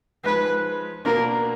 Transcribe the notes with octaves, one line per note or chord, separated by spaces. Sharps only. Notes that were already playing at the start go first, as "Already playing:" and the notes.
F3 G#3 D#4 B4
B2 A#3 D4 A#4